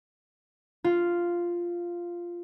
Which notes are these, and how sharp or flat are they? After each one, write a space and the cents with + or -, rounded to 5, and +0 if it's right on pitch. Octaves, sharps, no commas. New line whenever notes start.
F4 -5